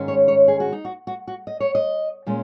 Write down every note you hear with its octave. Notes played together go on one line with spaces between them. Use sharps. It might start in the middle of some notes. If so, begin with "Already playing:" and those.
Already playing: G#2 D#3 G#3 C#4
C#5
C#5
G#4
F#4
D#4
F#4
F#4
F#4
D#5
C#5
D#5
A#2 G#3 C#4